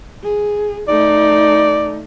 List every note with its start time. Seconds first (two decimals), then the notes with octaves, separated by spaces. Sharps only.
0.23 G#4
0.88 A3 D#4 D5